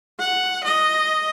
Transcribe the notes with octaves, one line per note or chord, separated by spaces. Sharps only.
F#5
D#5